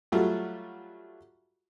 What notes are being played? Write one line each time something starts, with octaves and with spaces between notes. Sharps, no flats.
F#3 G3 A3 F4 F#4